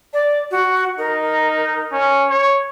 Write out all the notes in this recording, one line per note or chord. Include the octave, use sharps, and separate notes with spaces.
D5
F#4
D#4 A#4
C#4
C#5